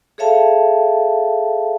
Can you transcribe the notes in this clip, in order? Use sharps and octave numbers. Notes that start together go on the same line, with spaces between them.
G#4 A4 C#5 E5 F5 A5